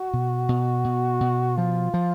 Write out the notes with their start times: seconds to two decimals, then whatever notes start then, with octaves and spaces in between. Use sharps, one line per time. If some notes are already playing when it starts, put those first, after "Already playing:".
Already playing: F#4
0.14 B2
0.49 B2
0.85 B2
1.21 B2
1.56 F3 F4
1.94 F3